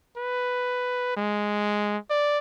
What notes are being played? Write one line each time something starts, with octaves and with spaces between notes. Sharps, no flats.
B4
G#3
D5